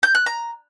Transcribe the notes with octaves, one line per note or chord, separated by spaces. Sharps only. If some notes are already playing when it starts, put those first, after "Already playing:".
G6
F#6
A#5